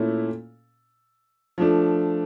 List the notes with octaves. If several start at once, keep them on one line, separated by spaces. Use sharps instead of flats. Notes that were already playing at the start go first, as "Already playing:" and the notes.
Already playing: A#2 A3 C#4 E4
F3 A3 D4